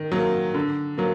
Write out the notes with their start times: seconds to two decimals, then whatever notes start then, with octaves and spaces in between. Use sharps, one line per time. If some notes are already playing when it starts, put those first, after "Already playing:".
Already playing: D#3
0.12 F#3 A#3
0.55 D3
0.98 F#3 A#3